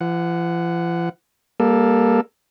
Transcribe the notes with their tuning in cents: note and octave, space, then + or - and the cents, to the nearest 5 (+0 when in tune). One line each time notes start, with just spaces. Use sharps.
F3 -45 F#5 +0
G3 +40 A#3 +10 A4 +0